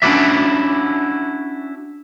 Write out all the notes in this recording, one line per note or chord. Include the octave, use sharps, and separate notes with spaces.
C#4 D4 E4 F#4 D5 E5